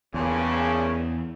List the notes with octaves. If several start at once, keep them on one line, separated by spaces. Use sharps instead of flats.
E2 G2 A#2 C#3